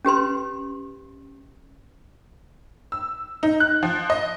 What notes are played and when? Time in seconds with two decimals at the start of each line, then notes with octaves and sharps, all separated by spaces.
0.05 C#4 G4 B4 C6
2.92 E6
3.43 D#4
3.60 F#6
3.83 F3
4.10 D#5